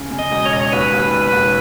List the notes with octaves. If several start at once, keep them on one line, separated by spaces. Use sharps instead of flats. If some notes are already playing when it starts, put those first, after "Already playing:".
Already playing: C#3
C#3
D#5
E1
C#5
E1 D#5
C#5
D#2 B4
D#2
E1
D#2